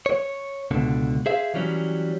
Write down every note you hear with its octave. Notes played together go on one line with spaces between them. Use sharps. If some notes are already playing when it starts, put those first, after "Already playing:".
C#5
C#2 B2 D3
G#4 C5 E5 F5
E3 F#3 G3 C#4